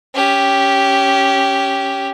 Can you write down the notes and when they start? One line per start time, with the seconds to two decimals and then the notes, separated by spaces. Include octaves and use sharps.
0.14 C#4 G4